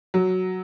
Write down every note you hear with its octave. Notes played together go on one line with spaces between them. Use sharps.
F#3